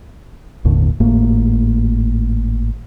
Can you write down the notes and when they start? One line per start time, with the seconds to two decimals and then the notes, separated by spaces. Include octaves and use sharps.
0.64 G1 D#2 A2 D3
1.00 G#1 A2 A3 A#3